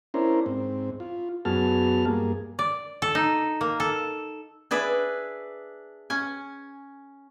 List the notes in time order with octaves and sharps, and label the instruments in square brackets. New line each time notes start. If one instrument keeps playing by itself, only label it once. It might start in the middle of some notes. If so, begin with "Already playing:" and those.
[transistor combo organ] C#4 D4 E4 A#4 C5
G#2 C4
F4
F#2 B3 F#4 G#4 A5 F6
G2 A#3 G#4
[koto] D5
A4
D#4
A#3
A4
D4 G#4 B4 D5 E5
C#4 G#5